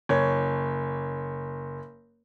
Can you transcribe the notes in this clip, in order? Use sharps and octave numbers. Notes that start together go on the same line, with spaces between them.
F#1 C#5